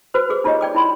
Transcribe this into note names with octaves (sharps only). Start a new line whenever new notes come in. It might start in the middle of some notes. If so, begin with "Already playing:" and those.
F#4 B4 C5
F#4 G#4 D6
D#4 F4 G4 C#5 D#5
D5 G5 D6
E4 B5 C6